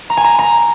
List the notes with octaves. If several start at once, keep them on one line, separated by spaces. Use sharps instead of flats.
A#5
G#5
A#5
A#5